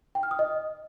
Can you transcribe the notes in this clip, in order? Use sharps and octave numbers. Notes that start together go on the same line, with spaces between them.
G5
F6
D#6
D#5